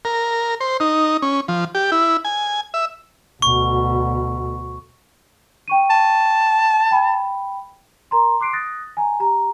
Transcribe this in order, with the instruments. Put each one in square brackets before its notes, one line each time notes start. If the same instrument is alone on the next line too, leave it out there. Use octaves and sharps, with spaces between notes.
[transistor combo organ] A#4
C5
D#4
C#4
F3
G4
E4
G#5
E5
[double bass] D2 B2 [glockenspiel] C#6
[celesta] G5 C#6 D#7
[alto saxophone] A5
[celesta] G5 B5
A#4 A#5 C6
C6 D6 F#6 C7 D7
D#6 F#6 A6 A#6
G#5 A#5
G4 A#5